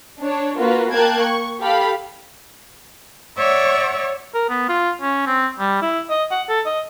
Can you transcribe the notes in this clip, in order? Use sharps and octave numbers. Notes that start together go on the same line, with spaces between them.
D4 C#5
A#3 F4 F#4 B4
A#3 G5 A5 F#6 G#6
C#6
G4 A4 F5 B5
C#5 D5 E5 F#5 C#6
A#4
B3
F4
C#4
C4
G3
E4
D#5
F#5
A4
D#5